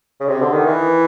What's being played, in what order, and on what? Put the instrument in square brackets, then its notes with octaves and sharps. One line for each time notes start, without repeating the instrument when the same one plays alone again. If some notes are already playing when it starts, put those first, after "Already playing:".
[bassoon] C#3
C3
D3
D#3
E3